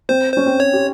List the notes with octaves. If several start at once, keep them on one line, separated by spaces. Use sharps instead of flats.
C4 C5
C#4 C5
C4
C#5
G4